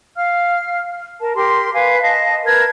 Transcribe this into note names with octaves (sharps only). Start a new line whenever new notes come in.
F5 F6
A#4 A5
G4 A#4 C6
B4 F5 G#5
D#5 F5 A5
A#4 B4 A5 G#6